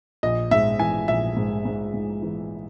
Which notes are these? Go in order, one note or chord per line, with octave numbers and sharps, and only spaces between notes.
A#1 D#5
G#2 E5
E3 G#5
A#1 E5
G#2
G#2
G#2
E3